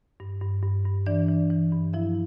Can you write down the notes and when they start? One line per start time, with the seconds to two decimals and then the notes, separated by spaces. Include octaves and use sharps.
0.20 G2
0.41 G2
0.63 G2
0.85 G2
1.06 E3 D4 D5
1.29 E3
1.50 E3
1.72 G2
1.93 F3 E4 E5